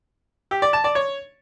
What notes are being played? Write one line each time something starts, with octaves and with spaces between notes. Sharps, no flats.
G4
D5
A5
D5
C#5